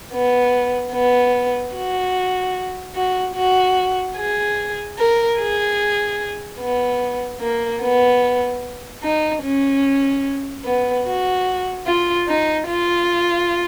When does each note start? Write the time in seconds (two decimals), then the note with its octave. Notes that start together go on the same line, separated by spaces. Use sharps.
0.13 B3
0.93 B3
1.74 F#4
2.95 F#4
3.36 F#4
4.17 G#4
4.99 A#4
5.39 G#4
6.60 B3
7.41 A#3
7.82 B3
9.04 D#4
9.43 C#4
10.65 B3
11.06 F#4
11.86 F4
12.28 D#4
12.68 F4